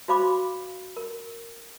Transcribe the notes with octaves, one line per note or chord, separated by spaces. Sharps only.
F#4 C5 F5 B5 D6
A#4